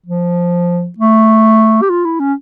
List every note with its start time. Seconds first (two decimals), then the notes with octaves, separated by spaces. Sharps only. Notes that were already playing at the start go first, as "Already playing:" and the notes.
0.06 F3
0.98 A3
1.82 G4
1.90 F4
2.05 E4
2.20 C#4